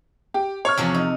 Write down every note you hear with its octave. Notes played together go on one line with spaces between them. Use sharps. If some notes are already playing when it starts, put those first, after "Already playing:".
G4
C#5 C#6 F6
E2 C3 F3
D#4